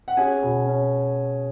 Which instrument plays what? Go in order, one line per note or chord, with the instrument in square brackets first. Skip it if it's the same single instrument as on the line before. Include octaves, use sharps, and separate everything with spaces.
[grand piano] F#5
C#4 G#4 G#5
B2
C#4